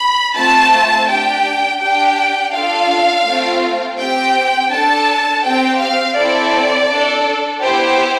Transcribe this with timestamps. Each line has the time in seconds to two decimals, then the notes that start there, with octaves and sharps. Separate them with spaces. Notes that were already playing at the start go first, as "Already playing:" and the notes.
Already playing: B5
0.35 A3 C4 F4 A5
1.07 D4 G4 G5
1.80 D4 G4 G5
2.52 D4 F4 A4 F5
3.26 A3 C4 F4
3.98 C4 G4 G5
4.71 D4 A4 A5
5.44 C4 G4 G5
5.79 F5
6.16 C4 E4 A4 D5
6.89 D4 A4
7.62 B3 E4 G4 C5